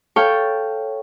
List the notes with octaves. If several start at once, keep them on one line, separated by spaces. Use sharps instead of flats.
A4 C#5 F5 G5 A5